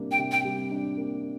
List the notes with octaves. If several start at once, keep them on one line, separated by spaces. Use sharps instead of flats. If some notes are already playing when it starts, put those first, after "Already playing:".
Already playing: C3 G3 A#3 D4
G5
C3
G5
G3
D4
A#3